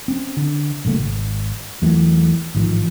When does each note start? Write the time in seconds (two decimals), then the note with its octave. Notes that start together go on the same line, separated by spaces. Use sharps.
0.08 C4 C#4
0.37 D3
0.85 B1 A#2 C#3 A3
0.98 G#1
1.82 E2 E3 F#3 A3
2.55 A1 G#2 D#3 F3